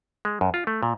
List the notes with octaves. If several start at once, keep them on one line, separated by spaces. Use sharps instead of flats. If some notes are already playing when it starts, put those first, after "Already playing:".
G#3
F#2
F4
A3
A#2